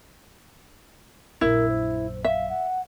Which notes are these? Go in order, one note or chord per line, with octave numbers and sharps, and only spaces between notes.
A#1 F#2 E4 A#4
C5
E5 F5
F#5